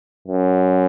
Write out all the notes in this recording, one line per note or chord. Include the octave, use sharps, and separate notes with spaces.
F#2